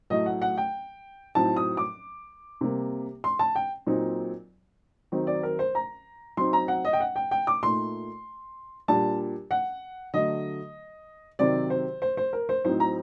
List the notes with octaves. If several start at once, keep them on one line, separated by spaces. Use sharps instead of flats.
A2 F#3 A3 D#5
F#5
F#5
G5
A2 F#3 C4 D#4 A5
D#6
D6
C3 G3 A#3
C6
A5
G5
A#2 F#3 C4 D#4
D#3 F#3 C4 D#4
D5
A#4
C5
A#5
F#3 C4 D#4 C6
A#5
F#5
D#5
G5
F#5
G5
G5
D6
A#2 A3 D#4 C6
A#2 G3 D4 A5
F#5
D3 F#3 A3 D#5
C3 D#3 F#3 C4 D5
C5
C5
C5
A#4
C5
A2 F#3 C4 D#4 C5
A#5